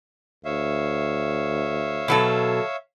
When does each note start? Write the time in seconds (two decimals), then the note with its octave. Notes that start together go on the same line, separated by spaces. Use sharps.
0.45 D2 C#5 E5 F5
2.08 B2 F#3 A4